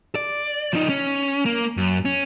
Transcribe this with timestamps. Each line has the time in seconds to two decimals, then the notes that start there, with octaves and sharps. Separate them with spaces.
0.15 D5
0.73 F3 D#4
0.89 C#4
1.46 A#3
1.77 F#2
2.05 C#4